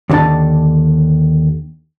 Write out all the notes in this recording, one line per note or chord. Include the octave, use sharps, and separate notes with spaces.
D#2 A#2 D3 D4 A5